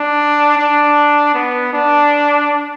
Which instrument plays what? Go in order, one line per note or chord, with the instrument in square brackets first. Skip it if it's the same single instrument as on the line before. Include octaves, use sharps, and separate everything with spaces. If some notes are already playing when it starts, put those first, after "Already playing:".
Already playing: [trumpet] D4
D4
B3
D4